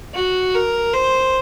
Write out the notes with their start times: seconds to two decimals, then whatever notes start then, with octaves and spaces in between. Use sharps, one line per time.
0.15 F#4
0.55 A#4
0.94 C5